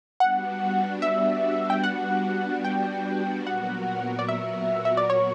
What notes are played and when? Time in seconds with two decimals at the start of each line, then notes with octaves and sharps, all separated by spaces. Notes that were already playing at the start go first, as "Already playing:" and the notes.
0.20 G3 B3 D4 F#4 F#5
1.02 E5
1.70 G5
1.83 F#5
2.64 G5
3.46 A#2 F#3 B3 F#4 A#4 F#5
4.19 D5
4.28 E5
4.85 E5
4.97 D5
5.10 C#5